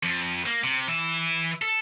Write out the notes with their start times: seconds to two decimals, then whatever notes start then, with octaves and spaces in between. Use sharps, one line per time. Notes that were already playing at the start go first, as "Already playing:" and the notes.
0.03 F2
0.46 A#3
0.64 C3
0.88 E3 E5
1.62 A4